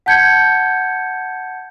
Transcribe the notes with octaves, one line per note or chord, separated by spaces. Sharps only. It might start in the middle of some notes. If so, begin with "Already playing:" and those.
F#5 A5 G6 G#6 C#7